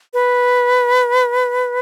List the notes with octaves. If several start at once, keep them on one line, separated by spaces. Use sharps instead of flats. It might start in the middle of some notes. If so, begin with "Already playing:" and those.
B4